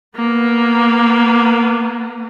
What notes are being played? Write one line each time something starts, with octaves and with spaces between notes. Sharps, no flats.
A#3 B3